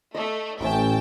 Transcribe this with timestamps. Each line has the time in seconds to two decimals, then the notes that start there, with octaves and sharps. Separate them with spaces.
0.14 A3 D#5
0.60 A1 A2 C#4 E5 G5 A5 E6